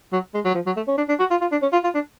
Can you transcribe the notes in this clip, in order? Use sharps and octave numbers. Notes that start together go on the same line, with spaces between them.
F#3
G#3
F#3
F3
F#3
A3
C#4
D4
D4
F#4
F4
F4
D4
C#4
F4
F4
D4